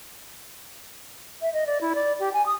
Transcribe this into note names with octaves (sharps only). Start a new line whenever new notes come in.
E5
D#5
D5
E4
D5
G4
G#5
D#6